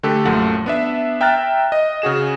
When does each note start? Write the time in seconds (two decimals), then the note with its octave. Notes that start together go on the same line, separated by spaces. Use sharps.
0.03 D3 A3 G4 A4
0.25 A#1 F#2 F3 A3 F#5
0.66 B3 D4 E5
1.21 E5 G5 A#5 F6 F#6 A6
1.72 D#5
2.02 C#3 F#4 G#4 E7